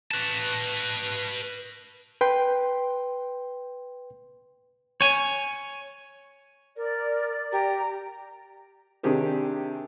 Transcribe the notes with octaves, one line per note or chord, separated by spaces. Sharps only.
B4 A5
B4 G5 C6
C#5 G#5
A#4 D5
G4 A#5
C3 D#3 D4 G4 G#4 C5